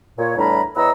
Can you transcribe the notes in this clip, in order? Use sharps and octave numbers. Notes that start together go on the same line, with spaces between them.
A#2 C#5
E2 A2 G3 D4 A#5 B5
E2 B4 C#5 D#5 A#5 E6